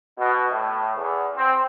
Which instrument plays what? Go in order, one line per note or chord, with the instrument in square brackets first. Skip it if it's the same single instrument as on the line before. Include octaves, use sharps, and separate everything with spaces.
[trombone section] B2
A2
E2
C4